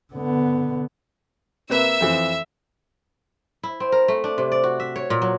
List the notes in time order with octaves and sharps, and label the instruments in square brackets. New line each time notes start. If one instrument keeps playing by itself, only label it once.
[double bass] D3 B3
[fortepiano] C3 A#3 B4 [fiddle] E5 E6
[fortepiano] F2 E3 F3
[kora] E4
C4
A#4
A3
D4
C3
D5
F#4
E5
C#5
A#2
F#3